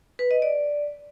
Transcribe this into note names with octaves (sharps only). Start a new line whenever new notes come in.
B4
D#5
D5